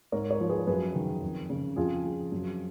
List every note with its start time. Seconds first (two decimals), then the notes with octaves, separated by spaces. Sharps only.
0.12 G#2 A#4 C#5
0.30 A#4 C#5
0.40 F3
0.49 G#4 B4
0.67 F#2 G#4 B4
0.95 D#3
1.22 F2
1.50 C#3
1.76 F2 F4 G#4
2.04 F3
2.32 F#2